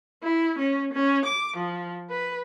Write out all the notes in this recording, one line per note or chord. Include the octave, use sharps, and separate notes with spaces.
E4
C#4
C#4
D6
F3
B4